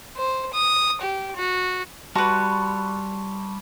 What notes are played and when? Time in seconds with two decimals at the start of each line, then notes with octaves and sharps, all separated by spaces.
0.17 C5
0.54 D#6
1.01 G4
1.36 F#4
2.15 G3 F#4 B4 A5 C6 C#6